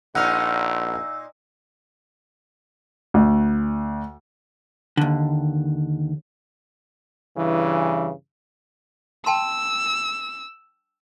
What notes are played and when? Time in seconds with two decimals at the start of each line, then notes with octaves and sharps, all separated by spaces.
0.15 A#1 A#2 A#3 D#4 F#5 E6 F6
3.14 D2
4.97 D#2 D3
7.38 G2 C#3 E3
9.26 G5 A5 C6 E6